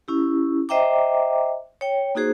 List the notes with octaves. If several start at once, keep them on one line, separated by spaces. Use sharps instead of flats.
C#4 E4 G4
C5 D#5 E5 G5 A#5 D6
C#5 G5
A#3 D#4 F#4 G#4 C5